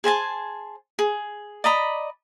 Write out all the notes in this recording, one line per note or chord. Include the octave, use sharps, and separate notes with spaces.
G#4 C5 G#5 A5
G#4
D5 D#5 A#5 B5